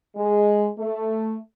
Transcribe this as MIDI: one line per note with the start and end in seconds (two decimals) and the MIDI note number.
0.15 0.68 56
0.79 1.36 57